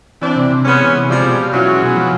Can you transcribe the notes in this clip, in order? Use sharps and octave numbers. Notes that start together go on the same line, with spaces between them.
E3 C4 D4
C3
C3
G#3 B3 C#4
E3
C3
F3 G3 G#3
B2
F4
E3 F#3 C#4
G#3
B2
F3